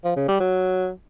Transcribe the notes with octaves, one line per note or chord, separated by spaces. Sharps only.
F3
C#3
G3
F#3